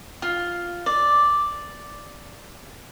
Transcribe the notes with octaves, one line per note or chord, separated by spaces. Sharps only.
F4
D5